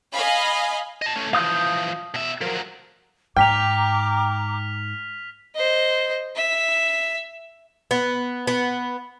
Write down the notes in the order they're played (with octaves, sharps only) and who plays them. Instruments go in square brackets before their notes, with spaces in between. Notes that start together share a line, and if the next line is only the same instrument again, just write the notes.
[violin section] D#5 F5 G#5 B5
[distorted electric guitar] D#5 A5
A3 C#4
[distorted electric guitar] E3 F3 [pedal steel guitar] F5 D#6 G6
[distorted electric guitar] B2 E5
[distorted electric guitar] F3 F#3 [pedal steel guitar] A#4
[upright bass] G#2 [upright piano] G5 [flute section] A#5 D6 [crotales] F6 B6 F7
[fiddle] C5 D#5
E5
[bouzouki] B3
B3